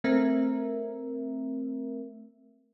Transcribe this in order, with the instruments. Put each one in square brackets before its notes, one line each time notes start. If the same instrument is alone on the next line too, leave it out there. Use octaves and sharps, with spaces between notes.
[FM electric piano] A3 C4 A#4 E5